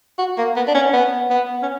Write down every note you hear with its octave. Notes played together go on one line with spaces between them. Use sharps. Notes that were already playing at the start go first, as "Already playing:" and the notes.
F#4
A#3
B3
D4
C#4
B3
B3
C#4